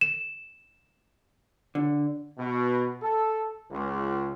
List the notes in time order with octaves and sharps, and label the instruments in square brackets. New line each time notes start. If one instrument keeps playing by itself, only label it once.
[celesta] E7
[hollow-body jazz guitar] D3
[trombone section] B2
A4
C#2